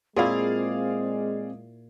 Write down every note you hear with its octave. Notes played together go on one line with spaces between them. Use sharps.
A#2 G#3 C4 E4 G#4 D5 F5